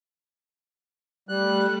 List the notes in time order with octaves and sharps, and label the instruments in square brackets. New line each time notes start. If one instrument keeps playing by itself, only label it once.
[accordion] G3 F#6 [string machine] A3